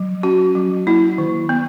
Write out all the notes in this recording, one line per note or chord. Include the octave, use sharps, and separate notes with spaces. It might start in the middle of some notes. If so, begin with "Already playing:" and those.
Already playing: F#3
C#4 F#4
F#3
A#3 E4
D#3
B3